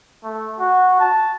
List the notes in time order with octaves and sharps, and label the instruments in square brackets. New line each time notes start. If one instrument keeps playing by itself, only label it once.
[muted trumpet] A3
F#4
A5